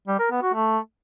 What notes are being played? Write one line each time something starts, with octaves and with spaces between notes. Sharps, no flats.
G3
A#4
B3
F#4
A3